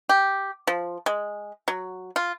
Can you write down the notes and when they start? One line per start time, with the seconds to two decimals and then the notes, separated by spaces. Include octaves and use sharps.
0.09 G4
0.67 F3
1.06 G#3
1.68 F#3
2.16 F4